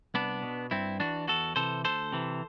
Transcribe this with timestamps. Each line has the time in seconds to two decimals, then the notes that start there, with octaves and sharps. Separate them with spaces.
0.14 C2 B3 D4
0.43 B2
0.71 G2 C4 E4
1.00 E3 D4 F#4
1.28 E2 F#4 A4
1.56 C3 E3 A4 C5
1.85 D2 A4 C5
2.12 C3 E3